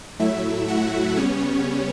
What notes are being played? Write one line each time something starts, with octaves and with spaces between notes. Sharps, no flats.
A2 F#3 A3 E4 E5
F#4 F#5
C#3 G3 B3 C#4 C#5